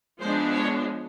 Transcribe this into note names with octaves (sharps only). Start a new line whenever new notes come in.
F3 G#3 B3 D4 C5
C#5